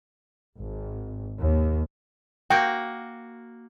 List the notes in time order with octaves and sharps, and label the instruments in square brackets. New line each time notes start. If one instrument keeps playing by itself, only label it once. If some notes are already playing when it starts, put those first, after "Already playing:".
[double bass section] G#1
D#2
[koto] A#3 F#4 [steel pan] G5